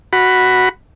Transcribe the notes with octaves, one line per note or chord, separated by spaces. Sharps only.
F#4 B5